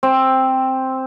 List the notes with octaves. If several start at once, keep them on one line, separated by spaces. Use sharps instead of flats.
C4